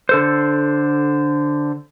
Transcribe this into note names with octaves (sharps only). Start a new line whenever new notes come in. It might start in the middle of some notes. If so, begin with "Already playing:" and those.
D3 A4 C5